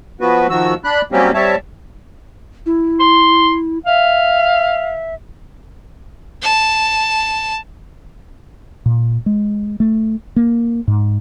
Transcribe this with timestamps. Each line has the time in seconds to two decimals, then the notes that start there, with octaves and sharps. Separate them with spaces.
0.21 F3 B3 F#4 B4
0.50 D#3 F3 F#4 E6
0.84 D4 B5 F#6
1.12 F#3 G3 A#3 C4 C#4 G4
1.34 G3 C4 C#5 E5 A5
2.66 E4
3.00 C6
3.86 E5 F5
6.42 A5
8.86 A#2
9.26 G#3
9.80 A3
10.36 A#3
10.88 G#2